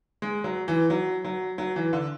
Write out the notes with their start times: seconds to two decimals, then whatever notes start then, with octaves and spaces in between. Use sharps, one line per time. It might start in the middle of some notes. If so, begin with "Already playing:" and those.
0.22 G#3
0.44 F#3
0.68 E3
0.90 F#3
1.25 F#3
1.58 F#3
1.76 E3
1.93 D3